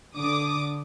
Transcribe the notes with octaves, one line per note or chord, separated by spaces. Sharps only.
D3 D6 D#6